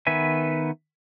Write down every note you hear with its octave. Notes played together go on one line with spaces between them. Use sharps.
D#3 B3 B4 E5 G#5